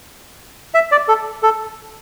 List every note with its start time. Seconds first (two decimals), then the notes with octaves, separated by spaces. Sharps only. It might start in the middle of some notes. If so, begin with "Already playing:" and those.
0.74 E5
0.92 D5
1.08 A4
1.43 A4